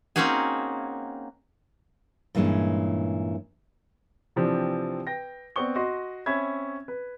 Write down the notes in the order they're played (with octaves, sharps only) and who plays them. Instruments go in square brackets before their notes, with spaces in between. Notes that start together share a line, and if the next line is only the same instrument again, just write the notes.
[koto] A#3 C4 C#4 D#4 F#4 G#4
[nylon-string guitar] G2 A#2 E3 G#3 C#4
[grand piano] C3 E3 F3 C4 D4
B4 G5 A#6
B3 C4 D5 C#6 G7
F#4 D#5 C6
C4 C#4 E5 B5 G#6
B4